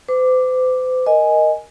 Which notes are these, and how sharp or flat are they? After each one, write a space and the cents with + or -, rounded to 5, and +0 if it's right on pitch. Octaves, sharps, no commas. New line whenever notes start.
C5 -45 D6 +0
A#4 +0 D#5 +0 G#5 +0